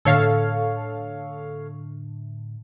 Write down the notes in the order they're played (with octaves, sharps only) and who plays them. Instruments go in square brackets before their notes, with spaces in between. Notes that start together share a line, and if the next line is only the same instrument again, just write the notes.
[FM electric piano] A2 D3 [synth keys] A4 C#5 F5